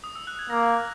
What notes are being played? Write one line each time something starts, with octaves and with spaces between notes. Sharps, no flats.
D#6
E6
F#6
G#6
A#3 A#6